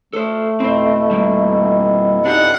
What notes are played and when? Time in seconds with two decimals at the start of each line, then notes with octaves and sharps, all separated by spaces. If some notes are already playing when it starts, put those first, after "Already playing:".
0.13 A3 A4 C5
0.60 F2 B2 C4 E4 C5
1.11 G3 A#3
2.26 D4 D#4 G4 F#5